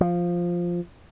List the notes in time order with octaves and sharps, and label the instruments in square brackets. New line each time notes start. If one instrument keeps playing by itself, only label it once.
[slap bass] F3